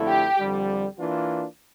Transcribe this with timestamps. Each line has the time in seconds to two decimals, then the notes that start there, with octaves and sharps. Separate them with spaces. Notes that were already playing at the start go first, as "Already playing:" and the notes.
Already playing: F2 D3 A3 E4
0.10 G4
0.39 F2 D3 G3
0.98 E3 A#3 D4 F4